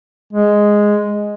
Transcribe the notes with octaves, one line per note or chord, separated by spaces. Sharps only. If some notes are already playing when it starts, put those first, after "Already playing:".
G#3